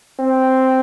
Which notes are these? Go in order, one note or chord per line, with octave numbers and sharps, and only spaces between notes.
C4